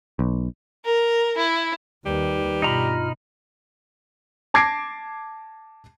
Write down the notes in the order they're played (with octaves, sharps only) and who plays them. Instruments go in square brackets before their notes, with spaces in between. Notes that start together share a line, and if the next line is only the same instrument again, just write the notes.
[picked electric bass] B1
[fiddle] A#4
E4
[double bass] D#2 [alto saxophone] G3 [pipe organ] D#4 B4
[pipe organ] G2 F4 F6 [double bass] B2 [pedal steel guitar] D#4 A#5 B5
[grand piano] A5 D6 G#6 A#6 C7 D7